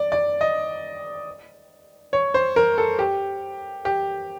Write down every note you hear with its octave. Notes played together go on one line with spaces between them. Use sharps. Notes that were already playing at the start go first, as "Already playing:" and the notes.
Already playing: D5
D5
D#5
C#5
C5
A#4
A4
G4
G4